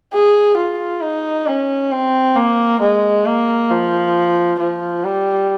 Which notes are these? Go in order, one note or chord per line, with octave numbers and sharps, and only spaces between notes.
G#4
F4
D#4
C#4
C4
A#3
G#3
A#3
F3
F3
G3